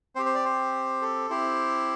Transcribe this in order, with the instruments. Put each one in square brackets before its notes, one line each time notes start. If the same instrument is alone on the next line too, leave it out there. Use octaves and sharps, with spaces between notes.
[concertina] C4 G4 C5
C5
D5
C5
A4
C4 E4 G4 C5